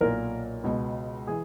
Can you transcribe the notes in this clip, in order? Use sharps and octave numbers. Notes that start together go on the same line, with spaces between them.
B1 A#2 A#4
C#2 B2
E3 G#4